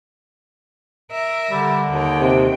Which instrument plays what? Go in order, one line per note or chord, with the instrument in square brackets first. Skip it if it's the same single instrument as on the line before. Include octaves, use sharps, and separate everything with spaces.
[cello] A#4 E5
[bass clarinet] D3 [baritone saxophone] G3
[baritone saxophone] D#2 [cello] D#3 G5
[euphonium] C3